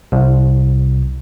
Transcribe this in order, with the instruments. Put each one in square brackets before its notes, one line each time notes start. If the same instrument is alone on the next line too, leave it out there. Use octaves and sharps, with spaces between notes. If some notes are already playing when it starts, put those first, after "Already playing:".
[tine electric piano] C2